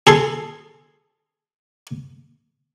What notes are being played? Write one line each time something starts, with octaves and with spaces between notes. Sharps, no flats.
G#4 A4 C6